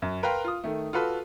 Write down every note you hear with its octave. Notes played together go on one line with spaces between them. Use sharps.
F#2
A#4 B4 F5 G5 A#5 C6
F4 D#6
D#3 A3
F4 F#4 A4 B4